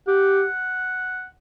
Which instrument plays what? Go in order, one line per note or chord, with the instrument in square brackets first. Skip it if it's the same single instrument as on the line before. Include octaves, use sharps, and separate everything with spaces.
[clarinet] G4 [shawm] F#5